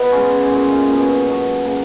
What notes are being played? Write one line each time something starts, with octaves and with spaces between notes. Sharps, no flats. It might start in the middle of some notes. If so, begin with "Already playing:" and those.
Already playing: B3 D#4 F4
C#3 G#3 C#4
A#2 G#3
B2 F#3
B2 F#3
C#3 F#3 A#3